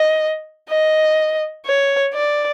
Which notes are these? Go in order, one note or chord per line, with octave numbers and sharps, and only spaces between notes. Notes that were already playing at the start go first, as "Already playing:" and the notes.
Already playing: D#5
D#5
C#5
D5